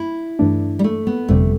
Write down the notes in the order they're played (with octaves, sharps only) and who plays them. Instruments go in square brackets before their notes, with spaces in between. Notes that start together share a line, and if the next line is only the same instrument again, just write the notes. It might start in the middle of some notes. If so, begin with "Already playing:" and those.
Already playing: [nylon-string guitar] E4
[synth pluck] G2 E3 A3 D4
[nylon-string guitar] G3
A3
B3
[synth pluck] G1 F2 C3 G3 [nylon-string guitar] A3